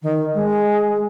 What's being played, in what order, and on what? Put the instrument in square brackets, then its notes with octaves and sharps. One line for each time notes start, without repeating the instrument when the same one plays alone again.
[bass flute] D#3
G#3